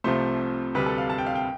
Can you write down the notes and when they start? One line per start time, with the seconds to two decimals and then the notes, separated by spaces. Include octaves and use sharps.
0.04 C2 C3 F3 A3 C5
0.75 D2 C3 G3 B4
0.86 A4
0.98 F5
1.10 A5
1.18 G5
1.26 F5
1.35 G5